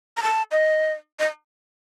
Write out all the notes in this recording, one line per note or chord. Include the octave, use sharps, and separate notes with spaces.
A#5
A5
D#5
D#5